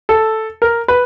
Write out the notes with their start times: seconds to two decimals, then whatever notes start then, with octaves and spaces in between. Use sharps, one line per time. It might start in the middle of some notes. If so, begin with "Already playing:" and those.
0.09 A4
0.62 A#4
0.88 B4